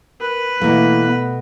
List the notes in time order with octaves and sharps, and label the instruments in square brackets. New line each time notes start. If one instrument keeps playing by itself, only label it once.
[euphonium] A#4 [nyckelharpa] B4
[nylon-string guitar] B2 A3 [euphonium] E3 [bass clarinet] A#3
[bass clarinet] B3